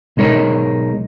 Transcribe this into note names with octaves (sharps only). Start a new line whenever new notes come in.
B1 G#3 D#4 A#4 C#5